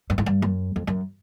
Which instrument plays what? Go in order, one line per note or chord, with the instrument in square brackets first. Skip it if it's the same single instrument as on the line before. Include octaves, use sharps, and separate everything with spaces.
[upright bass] G2
G#2
G2
F#2
F2
F#2